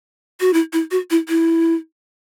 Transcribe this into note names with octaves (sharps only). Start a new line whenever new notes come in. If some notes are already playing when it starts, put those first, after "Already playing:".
F#4
E4
E4
F#4
E4
E4